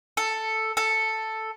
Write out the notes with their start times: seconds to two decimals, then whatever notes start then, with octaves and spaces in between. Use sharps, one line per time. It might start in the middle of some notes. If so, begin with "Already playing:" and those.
0.17 A4
0.77 A4